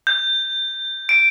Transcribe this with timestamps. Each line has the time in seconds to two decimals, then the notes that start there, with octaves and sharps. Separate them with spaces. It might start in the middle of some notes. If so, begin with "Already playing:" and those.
0.07 G6
1.09 D7